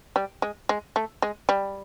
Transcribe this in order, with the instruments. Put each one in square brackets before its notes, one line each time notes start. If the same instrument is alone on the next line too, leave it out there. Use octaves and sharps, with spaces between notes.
[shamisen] G3
G#3
G#3
A3
G#3
G3